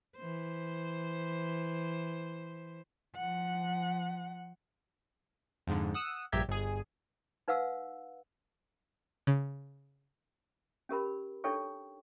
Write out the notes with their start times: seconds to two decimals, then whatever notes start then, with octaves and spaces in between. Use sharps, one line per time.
0.16 E3 C5
3.17 F3 F#5
5.67 F2 G#2 D3
5.94 F#5 D#6 E6
6.32 A#1 G2 G4 E5 A#5 G#6
6.49 G1 G#4
7.48 D#4 B4 F5 F#5 E6
9.27 C#3
10.89 C#4 G4 A#4 B5
11.44 D4 D#4 A4 C#5 G5 C#6